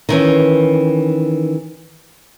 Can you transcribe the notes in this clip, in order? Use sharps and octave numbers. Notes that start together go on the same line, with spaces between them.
D#3 E3 C#4